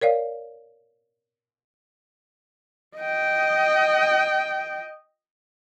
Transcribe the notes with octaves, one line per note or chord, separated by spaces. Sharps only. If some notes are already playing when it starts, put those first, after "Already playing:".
A#4 C#5 D5 F5
D#5 G5